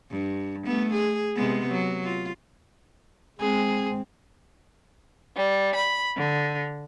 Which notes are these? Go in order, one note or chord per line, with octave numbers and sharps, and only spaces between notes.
G2
A3 B3
G#4
C3 G#3 B3
F#3
F4
G#3 C4 G#4
G3
B5
D3